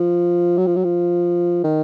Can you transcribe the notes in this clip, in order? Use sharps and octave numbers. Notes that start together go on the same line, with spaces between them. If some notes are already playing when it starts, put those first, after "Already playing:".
Already playing: F3
F#3
F3
F#3
F3
D#3